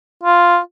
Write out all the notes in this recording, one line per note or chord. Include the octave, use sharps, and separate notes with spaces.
F4